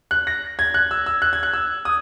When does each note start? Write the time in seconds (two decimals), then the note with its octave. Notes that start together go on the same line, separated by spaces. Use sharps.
0.11 F#6
0.27 A#6
0.59 G#6
0.74 F#6
0.91 E6
1.06 E6
1.22 F#6
1.33 G#6
1.43 F#6
1.53 E6
1.85 D#6